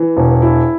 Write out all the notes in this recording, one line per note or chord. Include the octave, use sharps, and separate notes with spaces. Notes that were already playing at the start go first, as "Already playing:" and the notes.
Already playing: E3
E1
E4